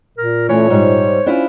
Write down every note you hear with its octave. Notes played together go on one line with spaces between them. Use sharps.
A#2 A#4
E3 A3 C#4 C#5
G#2 G3 C5
C#4 D4 E4 F4